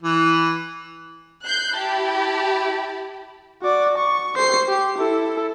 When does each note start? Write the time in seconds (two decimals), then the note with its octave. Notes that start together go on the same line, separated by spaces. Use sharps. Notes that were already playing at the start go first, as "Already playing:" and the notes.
0.03 E3
1.44 F#6 G6 C7
1.75 E4 G4 A5 B5
3.62 F#4 D5
3.98 C#6
4.36 C5 C7
4.68 G4
4.98 E4 A4